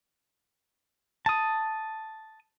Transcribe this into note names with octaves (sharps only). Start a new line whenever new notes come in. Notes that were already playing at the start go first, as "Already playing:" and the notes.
A5 D#6